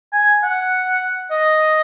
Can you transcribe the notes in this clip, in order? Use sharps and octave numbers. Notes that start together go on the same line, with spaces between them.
G#5
F#5
D#5